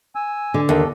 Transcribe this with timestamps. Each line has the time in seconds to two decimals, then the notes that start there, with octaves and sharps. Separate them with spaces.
0.15 G#5 E6
0.54 D3
0.69 D#2 A4